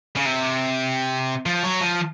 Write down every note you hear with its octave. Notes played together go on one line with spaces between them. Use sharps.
C#3
C3
F3
F#3
F3